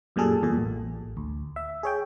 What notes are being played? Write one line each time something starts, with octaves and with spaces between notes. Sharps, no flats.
F#2 A#2 G3 G#4 A4
E2 A#2 A4
A1
D2
E5
G#4 C#5 G5